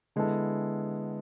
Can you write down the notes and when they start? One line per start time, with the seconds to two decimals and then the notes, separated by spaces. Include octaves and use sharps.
0.16 D3 G#3 B3 E4 A4